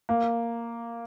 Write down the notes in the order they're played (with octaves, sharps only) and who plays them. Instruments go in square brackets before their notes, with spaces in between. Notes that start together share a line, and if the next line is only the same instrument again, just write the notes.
[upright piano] A#3